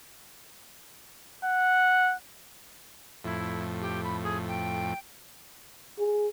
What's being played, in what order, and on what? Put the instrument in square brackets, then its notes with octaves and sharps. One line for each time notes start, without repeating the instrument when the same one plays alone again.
[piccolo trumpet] F#5
[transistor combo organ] F2 A2 [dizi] E4
[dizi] G4
B5
G#4
G5
[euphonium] G#4